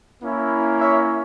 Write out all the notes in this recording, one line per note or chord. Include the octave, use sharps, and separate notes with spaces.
A#3 C#4 E4
C#5 E5